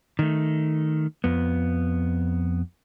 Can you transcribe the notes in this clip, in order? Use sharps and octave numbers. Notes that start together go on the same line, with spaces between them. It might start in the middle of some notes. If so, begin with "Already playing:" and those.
D#3 A3
F2 B3